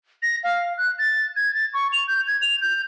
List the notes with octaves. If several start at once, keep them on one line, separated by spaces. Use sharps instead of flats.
A#6
F5
F#6
A6
G#6
A6
C#6
F7
G6
G#6
F7
G6